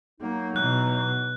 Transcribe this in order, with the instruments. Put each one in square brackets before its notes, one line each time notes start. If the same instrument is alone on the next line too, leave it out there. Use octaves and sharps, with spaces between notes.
[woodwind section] F#3 D#4 [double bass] A#3
[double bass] B2 E3 [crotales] F#6